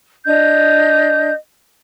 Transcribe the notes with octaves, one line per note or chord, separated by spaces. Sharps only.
D4 D#5 G6